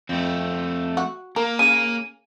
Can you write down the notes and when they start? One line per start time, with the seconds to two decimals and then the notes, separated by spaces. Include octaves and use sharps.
0.09 F2 A3 C4
0.97 F#4
1.36 A#3 A#4
1.59 C#3 G#5